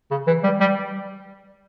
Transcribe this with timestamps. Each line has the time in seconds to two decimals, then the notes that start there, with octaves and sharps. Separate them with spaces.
0.11 C#3
0.27 E3
0.44 G3
0.60 G3